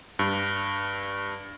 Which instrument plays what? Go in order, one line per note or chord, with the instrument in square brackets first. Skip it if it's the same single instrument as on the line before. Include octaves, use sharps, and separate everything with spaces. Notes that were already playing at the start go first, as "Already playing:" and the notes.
[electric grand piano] G2